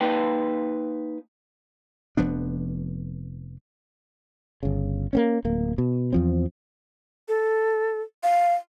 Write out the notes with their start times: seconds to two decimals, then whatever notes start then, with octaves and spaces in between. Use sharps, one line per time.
0.01 A#3 D#4 B4 G5
2.17 F1 F3 B3 D4
4.63 G1 C#3
5.13 A#3 C4 C#4
5.45 D1 A#3
5.78 B2
6.13 E2 F3 C4
7.28 A4
8.23 F5